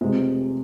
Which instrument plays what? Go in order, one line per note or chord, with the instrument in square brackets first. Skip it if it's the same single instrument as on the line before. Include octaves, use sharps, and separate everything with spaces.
[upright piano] F1 F2 C3 G#3